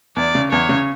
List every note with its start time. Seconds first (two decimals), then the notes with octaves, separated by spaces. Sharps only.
0.16 E2 D5
0.35 C#3
0.52 E2 C#5
0.69 C#3